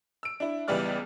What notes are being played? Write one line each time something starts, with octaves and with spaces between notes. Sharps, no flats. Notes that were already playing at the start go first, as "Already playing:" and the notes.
E6 D7
D4 E4
C#2 E3 G3 B3 D5 F6